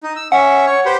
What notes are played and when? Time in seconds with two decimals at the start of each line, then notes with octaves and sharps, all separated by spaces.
0.03 D#4
0.16 E6
0.32 C#4 E5 F#5
0.67 C#5
0.86 G4 B4 C5